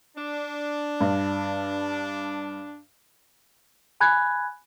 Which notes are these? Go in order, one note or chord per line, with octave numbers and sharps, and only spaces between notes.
D4
G2
G#5 B5 F#6 G#6